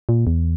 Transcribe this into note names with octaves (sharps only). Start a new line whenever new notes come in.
A#2
E2